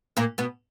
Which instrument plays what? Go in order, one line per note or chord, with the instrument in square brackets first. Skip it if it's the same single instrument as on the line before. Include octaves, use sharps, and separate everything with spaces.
[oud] A#2 A#3
B2 B3